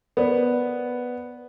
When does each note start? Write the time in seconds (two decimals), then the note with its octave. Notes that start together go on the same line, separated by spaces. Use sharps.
0.17 B3 A#4 C5 D5